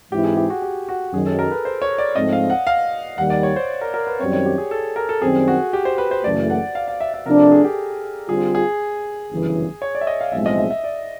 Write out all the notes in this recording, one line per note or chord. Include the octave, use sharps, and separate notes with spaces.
G#2 E3 G#3 C4 E4 G4
G#4
G4
F#4
G4
F#4
F#2 D#3 F#3 G#4
A4
A#4
B4
C5
C#5
D5
G#2 F3 A3 C4 D#5
F5
F#5
F5
D#2 D#3 G3 F#5
D5
C#5
C5
A#4
A#4
B4
F#2 D#3 G3 C4 C#5
C#5
G4
G#4
A4
A#4
A4
F#2 D#3 G3 C4 G#4
F#4
G4
C5
B4
C5
F#1 F#2 C#3 E3 A3 D5
F#5
F5
F5
E5
E5
C3 F3 A3 D4 A#4
A4
G#4
G4
D3 G3 C4 F4 G#4
G#4
G1 F#2 C#3 E3
C#5
D5
E5
D#5
F5
B1 A2 F3 G#3 C4 E5
D#5
E5
E5
D5